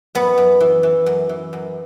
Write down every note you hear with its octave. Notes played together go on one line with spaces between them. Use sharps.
F#2 B3
F#2
E3
E3
F#2
E3
F#2